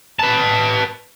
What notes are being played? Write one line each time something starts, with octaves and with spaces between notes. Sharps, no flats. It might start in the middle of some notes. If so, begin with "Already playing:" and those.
B4 A5